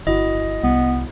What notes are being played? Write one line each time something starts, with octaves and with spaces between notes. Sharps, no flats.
G1 E4 F#4 D#5
C2 B3